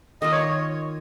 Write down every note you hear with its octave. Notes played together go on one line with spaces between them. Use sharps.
D#3 A#3 F4 D#5
C#5